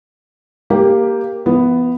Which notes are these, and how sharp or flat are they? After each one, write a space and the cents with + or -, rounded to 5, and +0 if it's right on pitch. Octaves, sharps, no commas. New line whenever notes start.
A#3 +0 G4 +5
E3 +45 B3 +5